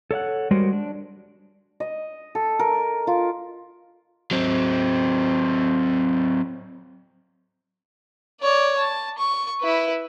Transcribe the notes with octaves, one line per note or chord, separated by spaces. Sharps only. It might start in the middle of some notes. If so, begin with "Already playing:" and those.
A4 C#5 F5 F#5
G3 G#3 F#4 A#4 C5
D4
D#5
A4
A#4
F4
F#3 C4
C#5 D5
A5
C#6
E4 B4